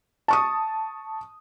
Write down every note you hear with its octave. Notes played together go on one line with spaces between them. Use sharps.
A5 C#6 D#6